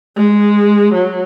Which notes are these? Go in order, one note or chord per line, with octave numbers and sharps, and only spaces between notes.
G#3
F#3